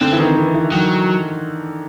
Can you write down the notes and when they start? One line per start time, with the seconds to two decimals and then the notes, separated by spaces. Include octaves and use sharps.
0.01 D3 C4
0.13 E3
0.19 D#3
0.37 E3
0.54 E3
0.72 D#3 F#3